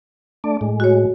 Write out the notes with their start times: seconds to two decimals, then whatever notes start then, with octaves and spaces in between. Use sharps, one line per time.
0.44 A3 D4 D5
0.61 A2 G#3
0.80 F#4 C#5